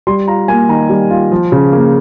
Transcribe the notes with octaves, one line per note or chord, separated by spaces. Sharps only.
G3 C6
F4 A#5
A#3 G#5
D#3 A#5
G3
F4
F3
C#3
A#3